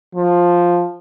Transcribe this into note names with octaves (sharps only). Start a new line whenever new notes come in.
F3